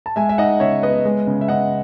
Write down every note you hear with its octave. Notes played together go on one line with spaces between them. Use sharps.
A5
G#3 E5 G#5
E5
D#4 D#5 F#5
C#3 C#5 E5
B3 B4 D#5
G#3
C#3
E5
C#3 D#5 F#5